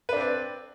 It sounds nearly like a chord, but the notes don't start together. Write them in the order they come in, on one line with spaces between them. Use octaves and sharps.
B4 D4 C4 D5